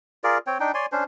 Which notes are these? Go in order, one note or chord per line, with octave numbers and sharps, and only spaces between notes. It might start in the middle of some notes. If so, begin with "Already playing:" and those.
F4 G#4 A#4 D5
C4 C#5 G5
D4 D#4 G5
C#5 D5 G#5 C6
C#4 D4 C5